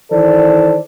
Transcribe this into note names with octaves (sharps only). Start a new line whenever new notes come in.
D#3 E3 A4 C5 D5